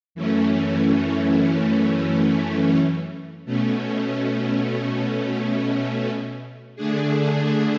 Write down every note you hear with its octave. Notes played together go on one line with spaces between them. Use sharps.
F#2 E3 A3 C#4
B2 A3 C#4
D3 A3 D4 G#4